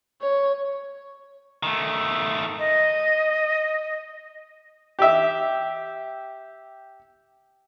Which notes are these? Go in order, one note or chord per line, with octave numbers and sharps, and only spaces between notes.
C#5
D#3 A3
D#5
G4 E5